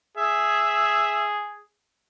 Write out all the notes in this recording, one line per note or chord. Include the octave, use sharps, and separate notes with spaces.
G#4 E5